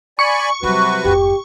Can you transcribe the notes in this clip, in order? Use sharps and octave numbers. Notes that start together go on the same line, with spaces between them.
D5 G#5 B5 C#6
C3 F#3 G3 F#4 B4
F1 G#2 G4